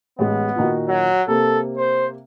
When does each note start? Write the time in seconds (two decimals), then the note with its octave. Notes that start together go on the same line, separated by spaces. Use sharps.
0.19 A1 G#3 B3
0.56 A#2 D#3 F#4
0.88 F#3
1.28 C3 A#3 A4
1.77 C5